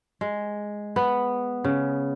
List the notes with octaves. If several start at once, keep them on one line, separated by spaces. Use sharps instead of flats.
G#3
B3
C#3